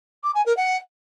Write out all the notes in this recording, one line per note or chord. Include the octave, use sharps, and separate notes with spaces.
D6
G#5
A#4
F#5